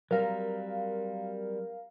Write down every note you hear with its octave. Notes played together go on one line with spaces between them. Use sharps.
F#3 G3 C4 A#4 F5